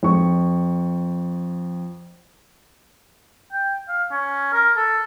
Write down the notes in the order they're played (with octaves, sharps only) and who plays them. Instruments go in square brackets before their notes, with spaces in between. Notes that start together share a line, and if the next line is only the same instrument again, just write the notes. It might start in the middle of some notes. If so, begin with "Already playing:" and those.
[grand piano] F2 C#6
[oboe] G5
F5
C#4
A#4
A4